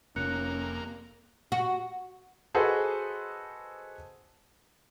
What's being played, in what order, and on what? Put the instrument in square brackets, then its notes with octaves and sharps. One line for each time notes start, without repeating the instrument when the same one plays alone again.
[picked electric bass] F1 [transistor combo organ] A#3 [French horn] C#4 [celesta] F#6 C#7
[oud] F#4
[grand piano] F#4 G#4 A4 B4 C5 D#5